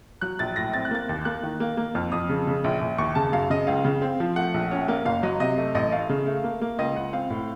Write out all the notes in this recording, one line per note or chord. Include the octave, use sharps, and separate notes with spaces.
F#3 F#6
A#1 A6
A2 A#6
C4 A6
F#6
A#3 A6
D#2
A#3 F#6
D#3
A#3
A#3
F2 F6
F2 D#6
C#3
C#3
A#1
A#1
D#2 C#6
C#3 A5
F#2 F5
C#3 D#5
C#2 F5
C#3
C4
F3
A3 F#5
A#1
C#4
A#3
F#1 F5
F#3 D#5
C3 D#5
A3
A1 D#5
A3 F5
C#3
A3
A#3
A#3
C#2 D#5
C#2 F#5
C4 F5
A2